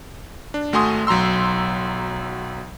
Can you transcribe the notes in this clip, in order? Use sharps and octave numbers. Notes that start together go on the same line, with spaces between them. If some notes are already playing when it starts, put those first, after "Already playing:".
D4
G#1 A3 F#4 G#5 C6 D#6
B1 F#3 A#5 C6 E6